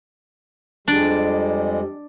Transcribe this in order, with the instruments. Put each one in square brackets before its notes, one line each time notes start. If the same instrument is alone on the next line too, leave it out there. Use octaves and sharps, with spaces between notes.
[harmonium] F2 G3 G#3 [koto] D4 D5